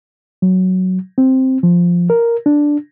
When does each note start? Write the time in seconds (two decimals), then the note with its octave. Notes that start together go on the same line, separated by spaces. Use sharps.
0.42 F#3
1.18 C4
1.63 F3
2.10 A#4
2.46 D4